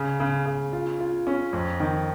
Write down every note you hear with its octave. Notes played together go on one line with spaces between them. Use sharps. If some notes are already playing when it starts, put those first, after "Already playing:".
Already playing: C#3
C#3
C#3
F4
F4
C#4
F2
D#3